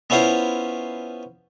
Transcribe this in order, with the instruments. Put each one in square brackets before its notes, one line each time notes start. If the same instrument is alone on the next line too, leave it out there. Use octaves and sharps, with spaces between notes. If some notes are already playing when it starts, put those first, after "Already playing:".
[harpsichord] B3 C#4 E4 F4 C5